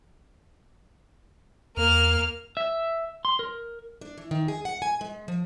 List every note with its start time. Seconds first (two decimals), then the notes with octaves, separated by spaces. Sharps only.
1.77 E2 A#3 F6
2.57 E5
3.25 C6
3.39 A#4
4.01 D4
4.18 E3
4.31 D#3
4.48 G#4
4.65 F#5
4.82 G#5
5.01 G#3
5.28 F3